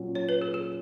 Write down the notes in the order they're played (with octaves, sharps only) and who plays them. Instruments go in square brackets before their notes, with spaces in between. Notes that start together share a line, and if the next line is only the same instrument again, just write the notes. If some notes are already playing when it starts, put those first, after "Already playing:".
Already playing: [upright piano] A#2 F#3 C#4
[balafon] C#5
B4
G#4
G#4